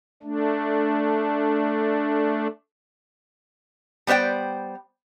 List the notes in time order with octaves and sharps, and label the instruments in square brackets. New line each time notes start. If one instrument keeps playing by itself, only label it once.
[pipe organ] A3 D4
[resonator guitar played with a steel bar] G3 B3 C5 D5 G5